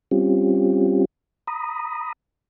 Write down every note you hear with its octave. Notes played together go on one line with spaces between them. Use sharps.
G3 C4 C#4 F4 G4
A#5 B5 D#6